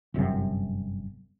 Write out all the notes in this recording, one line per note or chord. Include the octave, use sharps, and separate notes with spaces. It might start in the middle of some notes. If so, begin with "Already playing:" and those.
G1 F#2 A2 C3